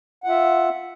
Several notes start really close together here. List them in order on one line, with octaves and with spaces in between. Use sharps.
F#5 F4 E5